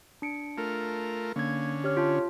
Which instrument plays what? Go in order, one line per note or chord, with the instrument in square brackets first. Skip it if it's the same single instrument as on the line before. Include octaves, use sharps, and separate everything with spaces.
[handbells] D4 C#7 D7
[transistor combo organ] A3 F4 A#4
[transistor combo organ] D3 C#4 [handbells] A#3 G#6
[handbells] G4 C#5 F6
F4 A5